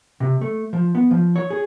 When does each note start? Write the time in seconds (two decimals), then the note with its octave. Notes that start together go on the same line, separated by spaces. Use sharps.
0.20 C3
0.41 A3
0.73 F3
0.95 B3
1.11 F3
1.36 C#5
1.50 G#4